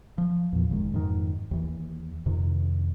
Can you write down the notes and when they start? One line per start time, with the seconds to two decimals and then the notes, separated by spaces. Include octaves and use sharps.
0.18 F3
0.52 E2 A#2 F3
0.70 F#1 D#3 G#3
0.93 F2 G#2 B2 D#3
1.51 D#2 E3
2.26 F2 C3 D#3